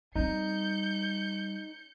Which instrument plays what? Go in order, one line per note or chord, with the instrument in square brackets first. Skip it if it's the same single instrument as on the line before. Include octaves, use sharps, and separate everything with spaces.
[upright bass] G3 C4 [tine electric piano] D#4 [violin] G6 C#7